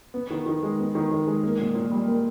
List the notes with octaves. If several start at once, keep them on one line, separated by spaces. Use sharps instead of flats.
B3
D#3
D#3
G#3
B3
D#3
D#3
G#3
A#3
A#2
A#2
G3
A#3